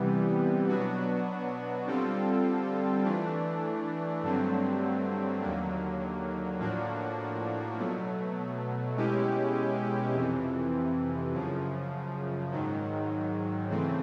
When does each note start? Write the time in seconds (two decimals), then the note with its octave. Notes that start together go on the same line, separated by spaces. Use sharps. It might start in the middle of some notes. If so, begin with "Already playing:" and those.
Already playing: C3 E3 G3 B3
0.68 B2 F#3 B3 D4 F#4
1.86 D3 G3 C4 F4 A4
3.05 E3 A3 D4
4.23 G2 D3 F#3 A3 C4
5.41 D#2 D3 F#3 A#3
6.59 A2 F3 A#3 D4 F#4
7.77 B2 F#3 A3
8.96 B2 G#3 C#4 E4 G4
10.14 F2 C3 E3
11.32 F#2 C#3 F3
12.51 G#2 D#3 F#3
13.70 C#3 E3 A3 C4